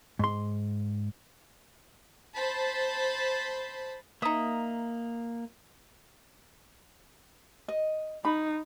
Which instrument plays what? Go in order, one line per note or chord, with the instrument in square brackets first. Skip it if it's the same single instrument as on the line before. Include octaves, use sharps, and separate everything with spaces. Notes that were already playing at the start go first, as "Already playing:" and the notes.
[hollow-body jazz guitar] G#2 C6
[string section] C5 A5 B5
[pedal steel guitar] A#3 D#6 [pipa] D#4 E5
[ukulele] D#5
[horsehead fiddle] D#4 [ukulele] B5